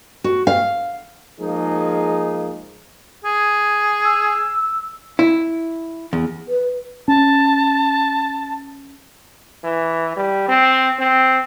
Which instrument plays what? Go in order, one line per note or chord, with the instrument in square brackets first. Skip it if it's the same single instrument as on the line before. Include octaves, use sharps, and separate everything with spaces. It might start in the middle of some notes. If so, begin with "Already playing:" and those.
[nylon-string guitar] F#4
F5
[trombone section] F3 G#3 A#3 D#4 G#4
[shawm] G#4
[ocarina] E6
[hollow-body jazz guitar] E4
E2
[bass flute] B4
[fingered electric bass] C#4 [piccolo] A5
[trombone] E3
G3
C4
C4